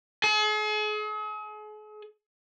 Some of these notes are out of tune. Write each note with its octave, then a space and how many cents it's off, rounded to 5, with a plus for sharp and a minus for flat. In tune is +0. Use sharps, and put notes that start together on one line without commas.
G#4 +40